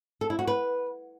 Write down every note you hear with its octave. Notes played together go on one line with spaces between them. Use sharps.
A4
E4
F#4
B4